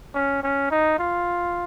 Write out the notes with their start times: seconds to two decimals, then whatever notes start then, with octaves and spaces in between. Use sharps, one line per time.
0.14 C#4
0.43 C#4
0.71 D#4
0.99 F4